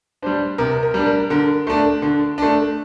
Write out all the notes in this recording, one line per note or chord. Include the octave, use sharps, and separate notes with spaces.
G3 D4 C5
C3 A#4
A#4
G3 D4
A#4
D3 A#4
A3 D4
D3
A3 D4